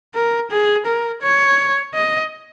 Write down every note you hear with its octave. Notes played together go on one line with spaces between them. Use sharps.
A#4
G#4
A#4
C#5
D#5